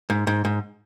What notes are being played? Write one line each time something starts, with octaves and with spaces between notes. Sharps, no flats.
G#2
G#2
G#2